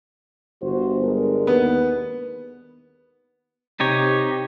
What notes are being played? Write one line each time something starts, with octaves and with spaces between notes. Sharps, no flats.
G1 F#4 C5
G#3 D4 A#4
D#2 B3
C3 D#4 G4 C#5